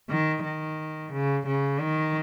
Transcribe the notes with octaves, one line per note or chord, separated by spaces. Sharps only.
D#3
D#3
C#3
C#3
D#3